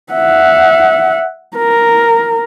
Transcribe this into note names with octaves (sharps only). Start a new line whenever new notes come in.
E5 F#5
A#4